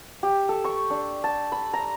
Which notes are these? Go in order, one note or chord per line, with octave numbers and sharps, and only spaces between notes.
G4
A4
C#6
D4
A5
B5
A#5